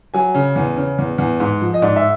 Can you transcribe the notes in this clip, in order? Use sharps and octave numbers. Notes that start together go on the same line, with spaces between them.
F#3 G#5
C#3
E2
C#3
E2
E2
G#2
F3
D#5
G#2 D5
E5